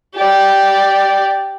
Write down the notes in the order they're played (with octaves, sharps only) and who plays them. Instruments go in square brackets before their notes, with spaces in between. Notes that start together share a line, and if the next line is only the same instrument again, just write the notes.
[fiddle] G4 D5